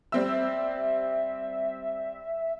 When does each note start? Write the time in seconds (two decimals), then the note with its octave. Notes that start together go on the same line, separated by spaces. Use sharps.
0.12 G3 C4 E5 E6